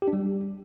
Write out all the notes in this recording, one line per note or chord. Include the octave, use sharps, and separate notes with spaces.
G4
D4
G3